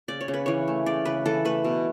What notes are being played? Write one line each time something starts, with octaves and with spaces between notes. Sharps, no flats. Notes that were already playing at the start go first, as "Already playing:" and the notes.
C#3 D5
C#5
C#3
B4
E3 C#5
A3
C#3 D5
C#3 B4
E3 A4
A3 B4
B2